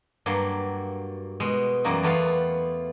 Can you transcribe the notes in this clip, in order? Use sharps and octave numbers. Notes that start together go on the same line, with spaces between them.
G2 F#3 A#3 C6
B2 G#3
F#2 E3 G3 A#3 D#4 F#4
E2 A3 B3 F4 B4 F5